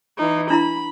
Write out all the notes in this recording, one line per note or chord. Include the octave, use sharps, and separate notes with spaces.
E3 D#4
D4 E4 A#5 B5